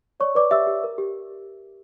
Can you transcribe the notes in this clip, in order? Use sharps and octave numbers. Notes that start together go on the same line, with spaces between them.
C#5 D5 C#6
B4 D5 D6
G4 E5 E6
G4
A#4
G4